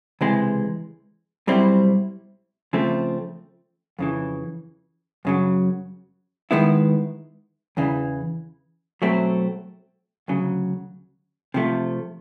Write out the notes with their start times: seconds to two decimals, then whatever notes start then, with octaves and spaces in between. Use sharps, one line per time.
0.21 C#2 C3 E3 G#3
1.47 B1 B2 G3 C4 E4
2.73 C#3 F3 A3 C4
3.99 F2 C#3 E3
5.25 F#2 C#3 F#3
6.51 D#3 G#3 B3 E4
7.77 E2 C#3 E3
9.02 B2 F#3 A3 C4
10.28 D2 C#3 F#3
11.54 C3 F3 A3